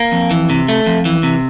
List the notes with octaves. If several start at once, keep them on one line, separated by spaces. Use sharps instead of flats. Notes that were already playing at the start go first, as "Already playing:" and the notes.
Already playing: A#3
F2
E3
C3
A3
F2
E3
C3